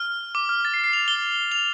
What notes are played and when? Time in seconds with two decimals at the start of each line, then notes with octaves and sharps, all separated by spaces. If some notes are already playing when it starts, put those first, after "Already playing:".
Already playing: F6
0.35 D6
0.49 F6
0.65 A6
0.74 C7
0.84 C7
0.93 F7
1.08 G7
1.52 F7